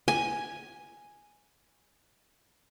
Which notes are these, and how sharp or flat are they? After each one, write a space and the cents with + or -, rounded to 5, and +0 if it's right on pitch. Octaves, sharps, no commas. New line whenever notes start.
G#5 +0